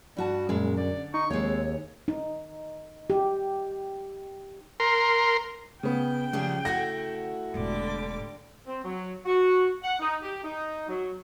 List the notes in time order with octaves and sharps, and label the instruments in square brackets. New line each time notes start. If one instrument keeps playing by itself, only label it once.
[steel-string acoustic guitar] G2 F#4 A5 [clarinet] G3
[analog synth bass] F#2 [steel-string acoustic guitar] A#2 G#3
[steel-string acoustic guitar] D3 [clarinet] D5
[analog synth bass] D#4 [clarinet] C#6
[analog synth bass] D#2 [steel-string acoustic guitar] G#3 C4 [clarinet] C#5
[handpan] D#4
G4
[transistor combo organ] A#4 C6
[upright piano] C#3 B3 [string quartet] G5
[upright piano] C#3 [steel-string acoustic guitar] F3 G3 G#4
[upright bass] C#3 [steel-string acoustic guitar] A3 E4 F#4 [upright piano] F#5 A#6
[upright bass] E1 A2 [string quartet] D3 G3 D6
[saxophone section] C4
F#3
F#4
F#5
D#4
G4
D#4
F#3